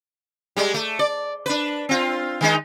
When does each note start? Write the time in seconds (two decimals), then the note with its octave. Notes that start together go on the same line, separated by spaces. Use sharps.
0.57 G3 G#3
0.74 A3
0.99 D5
1.46 D4 B4
1.89 C4 F4
2.41 D#3 G#3 D#4